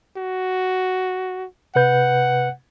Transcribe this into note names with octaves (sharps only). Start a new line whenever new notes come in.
F#4
C3 B4 F#5 G6